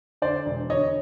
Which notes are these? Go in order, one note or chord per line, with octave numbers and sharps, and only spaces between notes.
D3 C5 D5
E1
D3 C#5 D#5